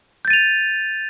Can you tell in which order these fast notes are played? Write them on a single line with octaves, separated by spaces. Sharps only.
G6 A6 D#7 F7